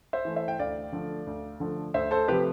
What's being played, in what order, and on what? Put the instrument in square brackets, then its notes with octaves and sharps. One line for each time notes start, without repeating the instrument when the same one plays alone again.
[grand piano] C5 E5
E3 A3
C5 E5
G5
D2 D5 F5
D3 F3 A3
D2
D3 F3 A3
D2 C5 E5
A4 C5
C3 F3 A3 G4 B4